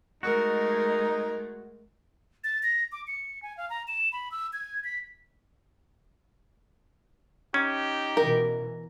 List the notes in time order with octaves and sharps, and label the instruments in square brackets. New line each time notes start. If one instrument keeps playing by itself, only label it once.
[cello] G#3 A3 [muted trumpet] D#4 [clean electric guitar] F#4 [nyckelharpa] A#4
[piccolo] A6
A#6
D6
C#7
G#5
F5
A#5
E7
B5
E6
G#6
B6
[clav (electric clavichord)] C#4 [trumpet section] D#4 G4
[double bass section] B2 E3 [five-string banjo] A#4